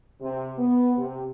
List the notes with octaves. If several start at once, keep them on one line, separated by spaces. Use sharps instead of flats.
C3
B3
C3